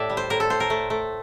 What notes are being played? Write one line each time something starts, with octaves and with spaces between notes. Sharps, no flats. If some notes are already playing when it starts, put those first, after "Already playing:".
Already playing: A2 G4 A4 D5 E5
G3
C5
A2 A#4
A4
A2 C5
A#4
A3
A3